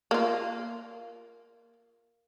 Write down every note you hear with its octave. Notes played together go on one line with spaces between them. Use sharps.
A#3 F4